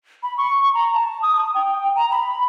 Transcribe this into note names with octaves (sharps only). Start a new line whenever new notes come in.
B5
C#6
A#5
A5
D#6
D#6
G5
A#5
B5